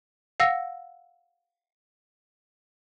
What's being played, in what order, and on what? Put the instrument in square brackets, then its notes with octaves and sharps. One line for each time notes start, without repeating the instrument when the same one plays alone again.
[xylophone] F5 F#5 E6 A#6